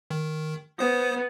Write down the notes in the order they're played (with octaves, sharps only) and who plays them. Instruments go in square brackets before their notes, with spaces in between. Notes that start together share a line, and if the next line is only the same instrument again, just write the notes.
[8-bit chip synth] D#3
[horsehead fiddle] B3 [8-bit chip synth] C5 D#6